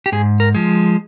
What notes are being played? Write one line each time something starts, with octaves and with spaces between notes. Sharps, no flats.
G4
G#2 G#4
A#4
F3 G#3